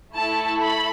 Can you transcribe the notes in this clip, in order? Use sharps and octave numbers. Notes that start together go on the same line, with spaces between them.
A3 E4 A4 A5
B5